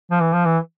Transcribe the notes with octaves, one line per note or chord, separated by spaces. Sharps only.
F3
E3
F3
E3